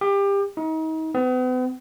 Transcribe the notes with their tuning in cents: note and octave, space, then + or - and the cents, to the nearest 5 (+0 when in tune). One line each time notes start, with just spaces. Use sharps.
G4 +25
D#4 +35
B3 +45